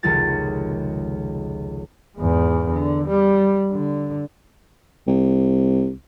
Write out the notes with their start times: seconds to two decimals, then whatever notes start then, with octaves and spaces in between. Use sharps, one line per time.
0.03 F1 C#2 D#3 G#3 F4 A6
2.16 E2 G#2
2.71 D3
3.08 G3
3.72 D3
5.07 C2